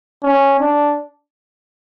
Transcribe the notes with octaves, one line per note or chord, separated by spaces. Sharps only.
C#4
D4